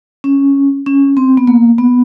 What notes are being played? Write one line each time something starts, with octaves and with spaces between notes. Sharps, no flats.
C#4
C#4
C4
B3
A#3
B3